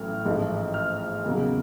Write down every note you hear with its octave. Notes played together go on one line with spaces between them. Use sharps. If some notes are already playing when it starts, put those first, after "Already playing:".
Already playing: A1 A2 F#3 F6
A1 G#2 F3 A3
F6
E2 C#3 F#3 A#3